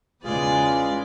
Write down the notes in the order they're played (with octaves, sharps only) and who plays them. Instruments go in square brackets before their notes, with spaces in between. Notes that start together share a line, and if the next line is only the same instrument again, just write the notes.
[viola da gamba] E2 B4 D5 [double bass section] C#3 G#3 [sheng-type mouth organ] F4 G#4